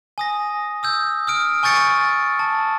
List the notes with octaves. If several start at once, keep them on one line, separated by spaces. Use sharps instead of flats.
G#5 D#6 A#6
D#6 E6 G6
D#6 F6 D7
G#5 C#6 G6 A6 C#7 D7
A5